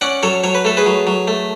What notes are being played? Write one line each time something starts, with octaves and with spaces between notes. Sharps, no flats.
C#4 D5 F#5
F#3 A4 C#5
F#3 C#5
B4
A3 A4
G#4 B4
F#3
F#3
A3